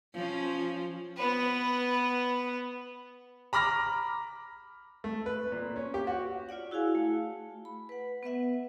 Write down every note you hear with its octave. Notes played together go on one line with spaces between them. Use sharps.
F3 C#4
B3 B4
A#5 B5 D6 F6 A#6
A3
B4
A#2
C#4
G4
F#4
F4 C#5 D5 F#5
E4 F#4 G#4 F5 G#5
A3
B5
B4 F#5
B3 B4 E5 F#5